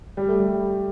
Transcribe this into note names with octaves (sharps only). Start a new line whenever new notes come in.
G3
A3
G3